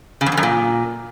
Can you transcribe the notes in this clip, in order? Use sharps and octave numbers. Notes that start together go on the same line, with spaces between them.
C#3
F2
E2
F#2
A#2